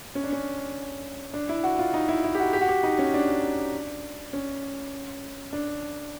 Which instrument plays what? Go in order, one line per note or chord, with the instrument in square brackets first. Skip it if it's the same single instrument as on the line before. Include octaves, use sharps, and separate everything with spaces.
[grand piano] C#4
D4
C#4
D4
E4
F#4
F4
D#4
E4
E4
G4
F#4
G4
F#4
G4
D#4
C#4
D4
C#4
D4